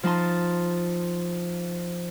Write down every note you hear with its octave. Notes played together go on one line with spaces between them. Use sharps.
F3 D#4 A5 C6